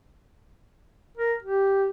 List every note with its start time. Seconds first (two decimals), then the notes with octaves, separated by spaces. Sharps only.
1.17 A#4
1.42 G4